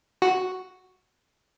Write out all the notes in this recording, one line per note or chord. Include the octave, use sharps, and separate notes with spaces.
F#4